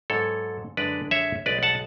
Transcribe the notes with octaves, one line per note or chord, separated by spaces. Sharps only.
G#2 F#3 B3 A4 C#5
F#2 D3 G#3 D4 B4 D5
C#5 E5
B1 B2 G#3 B4 D5
F#5 A5